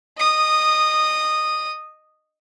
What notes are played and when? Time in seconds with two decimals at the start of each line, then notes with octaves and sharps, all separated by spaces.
0.18 D#5 D#6